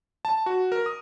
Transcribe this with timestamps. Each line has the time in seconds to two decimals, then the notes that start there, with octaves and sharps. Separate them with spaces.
0.25 A5
0.46 F#4
0.72 A#4
0.86 D#6